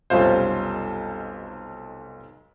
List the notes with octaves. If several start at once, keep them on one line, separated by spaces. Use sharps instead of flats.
F1 B1 G3 C#4 F4 C5